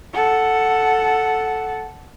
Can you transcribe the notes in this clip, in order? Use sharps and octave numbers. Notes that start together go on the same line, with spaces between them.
A4 F#5